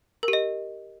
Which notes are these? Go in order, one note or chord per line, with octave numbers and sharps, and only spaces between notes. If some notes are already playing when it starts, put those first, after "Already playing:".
A#4
G4
D#5